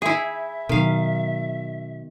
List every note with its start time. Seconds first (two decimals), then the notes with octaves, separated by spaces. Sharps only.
0.02 E4 G#4 E5
0.69 B2 D#3 F#3 F5